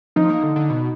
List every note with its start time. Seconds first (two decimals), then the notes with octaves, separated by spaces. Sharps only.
0.16 F3 D#4
0.30 A#3
0.43 D3
0.56 D3
0.70 B2